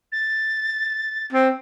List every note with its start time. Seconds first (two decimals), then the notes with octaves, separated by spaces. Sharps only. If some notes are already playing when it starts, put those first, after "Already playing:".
0.12 A6
1.33 C4